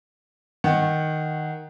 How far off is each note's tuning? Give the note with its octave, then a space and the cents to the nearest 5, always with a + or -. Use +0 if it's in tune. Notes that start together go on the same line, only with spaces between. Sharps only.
D#3 +0 F#5 +0